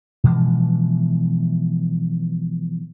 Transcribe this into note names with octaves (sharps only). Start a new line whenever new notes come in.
B2 E3 F3 G#3